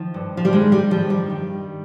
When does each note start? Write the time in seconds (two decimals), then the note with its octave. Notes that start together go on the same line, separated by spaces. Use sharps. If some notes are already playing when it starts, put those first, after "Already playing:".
Already playing: D#3 F3
0.14 G2
0.37 F3
0.45 G3
0.52 D#3 G#3
0.72 G3
0.91 G2 F3
1.10 G3
1.29 D#3